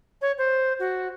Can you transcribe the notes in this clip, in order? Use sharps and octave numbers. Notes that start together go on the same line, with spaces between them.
C#5
C5
F#4